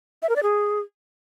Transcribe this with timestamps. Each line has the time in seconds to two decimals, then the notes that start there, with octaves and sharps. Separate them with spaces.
0.22 E5
0.29 A#4
0.36 D5
0.43 G#4